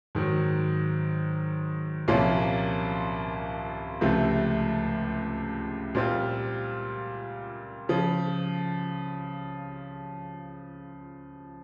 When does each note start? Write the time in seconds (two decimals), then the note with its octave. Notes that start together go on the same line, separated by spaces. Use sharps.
0.15 G#2 D#3 F#3
2.08 C2 A#2 F3 A#3 C#4
4.01 C#2 C3 F3 A3
5.95 A#2 G3 C4 F4
7.89 C#3 F3